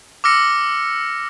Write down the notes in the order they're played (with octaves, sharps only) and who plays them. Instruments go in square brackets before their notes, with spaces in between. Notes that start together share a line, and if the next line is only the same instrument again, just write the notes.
[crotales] D6 E6 F6 A#6 C#7